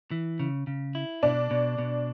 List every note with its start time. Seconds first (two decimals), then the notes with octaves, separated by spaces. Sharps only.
0.11 E3
0.40 C#3
0.67 C#3
0.95 E4
1.23 B2 D4
1.51 B2
1.79 B2